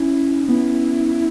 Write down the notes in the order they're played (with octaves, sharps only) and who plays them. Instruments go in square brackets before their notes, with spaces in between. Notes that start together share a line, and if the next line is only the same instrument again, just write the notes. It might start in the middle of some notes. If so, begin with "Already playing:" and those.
Already playing: [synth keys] C#4 [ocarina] E4
[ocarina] D#4
[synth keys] B3 [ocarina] E4